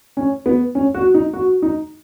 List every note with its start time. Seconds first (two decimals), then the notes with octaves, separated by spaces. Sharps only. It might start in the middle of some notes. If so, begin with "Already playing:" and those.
0.17 C#4
0.46 B3
0.75 C#4
0.94 F#4
1.14 D#4
1.33 F#4
1.62 D#4